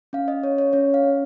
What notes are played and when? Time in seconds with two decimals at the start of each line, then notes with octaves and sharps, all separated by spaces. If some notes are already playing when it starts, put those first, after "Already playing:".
0.13 C#4 F5
0.28 D#5
0.43 C#4 C#5
0.58 C#5
0.73 C#4 C#5
0.94 F5
1.04 C#4